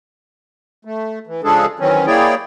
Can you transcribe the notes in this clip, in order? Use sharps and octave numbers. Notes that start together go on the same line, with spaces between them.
A3
E3
C#3 F3 G#3 D4 G#4 A4
D#3 E3 F#3 C4 C#4
A#3 E4 G#4 C#5 D5 G5